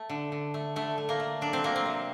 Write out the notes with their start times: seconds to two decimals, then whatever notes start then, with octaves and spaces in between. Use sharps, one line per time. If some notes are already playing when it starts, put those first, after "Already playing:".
Already playing: A3
0.09 D3
0.32 D3
0.54 A3
0.76 D3 A3
0.98 A3
1.09 A#3
1.20 A3
1.41 F#3 D4
1.53 C4
1.64 F#3 A#3
1.76 C4
1.85 C3